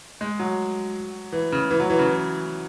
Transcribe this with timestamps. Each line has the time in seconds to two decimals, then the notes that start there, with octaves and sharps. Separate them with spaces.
0.21 G#3
0.40 F#3
1.32 E3
1.52 C#3
1.70 E3
1.80 F#3
1.90 E3
1.99 C#3
2.07 E3